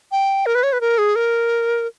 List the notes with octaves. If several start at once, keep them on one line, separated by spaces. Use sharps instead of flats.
G5
A#4
B4
C#5
B4
A#4
G#4
A#4